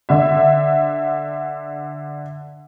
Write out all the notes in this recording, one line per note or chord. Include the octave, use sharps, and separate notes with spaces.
D3 E5